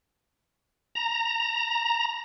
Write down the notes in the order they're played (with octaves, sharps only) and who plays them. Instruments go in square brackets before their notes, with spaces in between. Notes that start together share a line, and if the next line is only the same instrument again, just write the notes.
[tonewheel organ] A#5